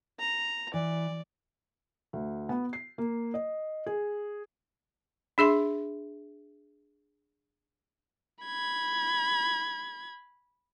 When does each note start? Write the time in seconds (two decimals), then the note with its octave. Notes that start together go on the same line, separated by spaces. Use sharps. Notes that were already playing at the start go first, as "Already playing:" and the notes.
0.19 A#5
0.74 E3 D5
2.13 D2
2.49 B3
2.73 C7
2.98 A#3
3.34 D#5
3.86 G#4
5.38 D4 G#4 E5 C6
8.44 B5 G#6